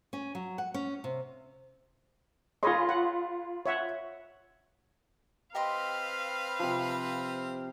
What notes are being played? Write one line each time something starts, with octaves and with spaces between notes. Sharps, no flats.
C#4
F#3
F#5
C#4
C3
F4 G#4 C#5 D#5 B5 C6
F#5
C#5 E5 F#5
C4 G4 B4 D#5 F5 C6
C3 F3